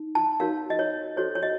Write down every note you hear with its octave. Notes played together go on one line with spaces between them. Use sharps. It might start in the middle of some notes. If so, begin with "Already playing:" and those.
Already playing: D#4
A5
D#4 F#4 A#4 C#5 F5
D#5
C#5
F#4 A4 C5 C#5
C#5
D#5